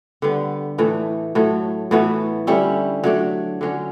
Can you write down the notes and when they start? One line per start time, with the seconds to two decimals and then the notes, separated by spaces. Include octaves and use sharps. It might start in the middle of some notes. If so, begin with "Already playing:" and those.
0.22 D3 G3 B3
0.78 A2 E3 A3
1.35 A2 F#3 A3
1.91 A2 E3 B3 F#4
2.47 D3 G3 C#4 E4
3.04 F#3 A3 D4
3.61 D3 F#3 C#4